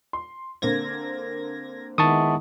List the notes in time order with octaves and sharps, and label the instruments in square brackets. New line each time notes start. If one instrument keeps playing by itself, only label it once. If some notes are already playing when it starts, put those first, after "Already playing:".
[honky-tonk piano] C6
[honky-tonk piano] D3 A#3 C4 [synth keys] G#6 A#6
[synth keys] D#3 [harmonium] G#3 B3 E4 [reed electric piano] A5 C#6 D#6